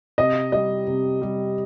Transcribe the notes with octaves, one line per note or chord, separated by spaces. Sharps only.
C3 D#5
G3 D#5
C3
G3